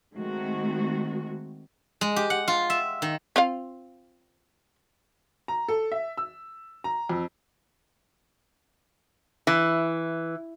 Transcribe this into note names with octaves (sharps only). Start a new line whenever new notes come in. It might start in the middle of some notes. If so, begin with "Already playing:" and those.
D#3 G#3 A3 C4 F#4
G#3
G4
F#5
F4
E5
D#3
C4 F4 F5
A#5
A4
E5
E6
A#5
F2
E3